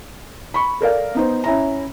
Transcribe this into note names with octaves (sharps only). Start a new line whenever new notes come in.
B5 C#6
A4 A#4 D5 F5
B3 D#4 C5
C#4 E4 A#5